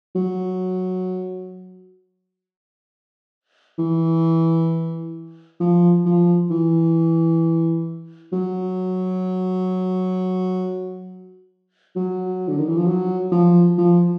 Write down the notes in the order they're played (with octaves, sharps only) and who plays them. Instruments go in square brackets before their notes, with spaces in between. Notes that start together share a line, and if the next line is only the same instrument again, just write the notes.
[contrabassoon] F#3
E3
F3
F3
E3
F#3
F#3
D3
D#3
E3
F3
F#3
F3
F3